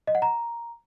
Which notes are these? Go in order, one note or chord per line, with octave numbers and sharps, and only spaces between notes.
D#5
F#5
A#5